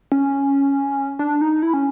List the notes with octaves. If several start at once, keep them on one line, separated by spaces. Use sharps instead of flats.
C#4
D4
D#4
E4
C#4